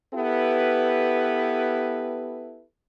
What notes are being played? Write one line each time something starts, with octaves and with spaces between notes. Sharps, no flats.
B3 E4 G4 A4 B4